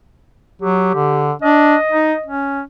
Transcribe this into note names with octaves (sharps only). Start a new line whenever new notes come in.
F#3 G4
D3
D4 D#5
D#4
C#4